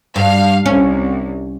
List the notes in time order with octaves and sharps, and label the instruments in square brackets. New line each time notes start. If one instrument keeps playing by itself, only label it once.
[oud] G2 [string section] F5
[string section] C2 [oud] C#4